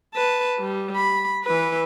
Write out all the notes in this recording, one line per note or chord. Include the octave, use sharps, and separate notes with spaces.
B4 A5
G3
B5
E3 B4